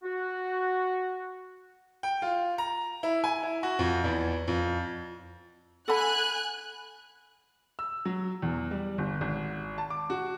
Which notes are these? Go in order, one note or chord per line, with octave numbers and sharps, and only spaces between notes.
F#4
G5
F4
A#5
E4
G#5
E4
F#4
F2
E2
F2
A4 F#5 G#5 B5 F#6
E6
F#3
E2
G3
G1
G#1
A5
D6
F#4